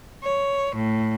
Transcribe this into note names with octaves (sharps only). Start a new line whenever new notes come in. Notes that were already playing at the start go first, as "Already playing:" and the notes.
C#5
A2